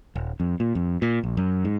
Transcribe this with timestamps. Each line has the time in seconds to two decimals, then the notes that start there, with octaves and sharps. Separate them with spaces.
0.15 D#1
0.40 F2
0.60 A#2
0.75 F2
1.02 A#2
1.23 A#1
1.37 F#2
1.65 G#2